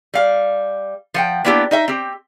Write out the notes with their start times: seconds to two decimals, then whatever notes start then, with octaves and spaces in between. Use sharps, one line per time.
0.14 G3 F5
1.14 F3 F#5 G5
1.45 A#3 B3 D4 E4 F4 G4
1.71 D#4 D#5 E5
1.88 C4 G4